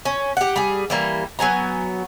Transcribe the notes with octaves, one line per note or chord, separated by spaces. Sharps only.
C#4
G4 F#5
G3 G#4
E3 G3 A#3
F#3 B3 G#5 A#5